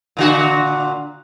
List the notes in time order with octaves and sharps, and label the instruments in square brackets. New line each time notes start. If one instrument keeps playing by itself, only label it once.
[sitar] A#2 D3 F#4